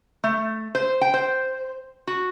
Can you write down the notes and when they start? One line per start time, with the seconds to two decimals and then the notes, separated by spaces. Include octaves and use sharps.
0.24 A3
0.75 C5
1.01 G5
1.14 C5
2.07 F#4